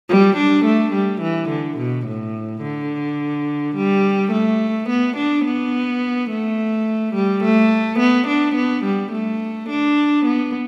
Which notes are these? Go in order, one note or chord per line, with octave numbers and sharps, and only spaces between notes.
G3
D4
A3
G3
E3
D3
B2
A2
D3
G3
A3
B3
D4
B3
A3
G3
A3
B3
D4
B3
G3
A3
D4
B3